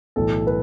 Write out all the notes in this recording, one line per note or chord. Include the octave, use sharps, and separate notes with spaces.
B1 A2 E3 A4
B4